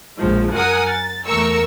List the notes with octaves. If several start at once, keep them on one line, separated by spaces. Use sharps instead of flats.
A#1 F3 G#3
F#2 A#4 F#5 G#5 D#6
A6
E2 A3 A#4 C#6 E6